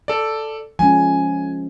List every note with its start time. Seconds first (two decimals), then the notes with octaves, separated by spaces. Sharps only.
0.08 A4 D5
0.79 F3 G#3 C#4 G#5